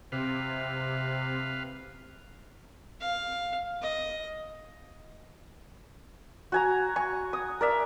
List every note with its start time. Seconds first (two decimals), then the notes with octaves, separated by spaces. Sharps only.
0.12 C3 B4 F5
3.01 F5
3.82 D#5
6.52 F#4 G#5 A#5
6.96 G#5 C#6
7.33 D#6
7.61 A#4 D5 E5